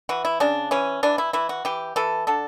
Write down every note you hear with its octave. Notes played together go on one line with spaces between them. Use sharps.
E3 F#4
E4
C#3 D4
E3 C#4
E3 D4
E4
E3 E4
F#4
E3 G4
E3 A4
D3 A4